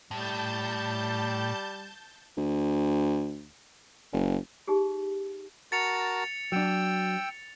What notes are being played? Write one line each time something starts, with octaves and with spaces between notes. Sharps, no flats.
A2 G3 A5 G6
D2
F#1
D#4 G4 G#4
F#4 A#4 A5 A6 C#7 F7
F#3 D4 G5 E6